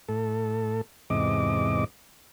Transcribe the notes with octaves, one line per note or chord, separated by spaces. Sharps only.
A2 A4
E2 G#2 C3 D#5 D6